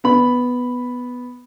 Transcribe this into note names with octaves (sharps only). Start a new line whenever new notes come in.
B3 B5